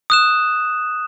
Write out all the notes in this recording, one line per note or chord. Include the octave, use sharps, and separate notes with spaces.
D#6 F#6 E7